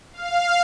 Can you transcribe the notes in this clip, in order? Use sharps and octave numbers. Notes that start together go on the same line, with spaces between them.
F5